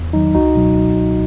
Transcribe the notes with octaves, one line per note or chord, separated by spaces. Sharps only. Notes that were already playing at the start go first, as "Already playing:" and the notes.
Already playing: E2
D#3 F#3 D#4
C#2 D#4 F#4
B2 F#3